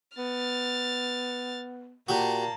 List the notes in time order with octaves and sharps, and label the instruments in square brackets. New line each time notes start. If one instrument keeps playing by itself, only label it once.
[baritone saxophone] B3 [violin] F6 A6
[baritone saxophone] A#2 [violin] A#3 A5 [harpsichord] F#4 G4